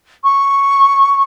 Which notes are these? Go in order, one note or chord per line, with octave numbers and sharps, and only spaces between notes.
C#6